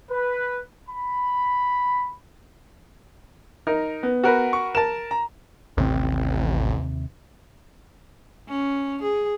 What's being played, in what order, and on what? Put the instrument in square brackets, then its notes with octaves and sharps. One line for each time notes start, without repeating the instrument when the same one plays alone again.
[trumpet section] B4
B5
[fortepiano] D#4 A#4
[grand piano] B3
[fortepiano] F#4 A#4 B4
[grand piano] C#6
[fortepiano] A#4 A5 [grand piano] E7
[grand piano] A#5
[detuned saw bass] A1 [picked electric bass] D#2 C3 C4
[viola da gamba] C#4
G#4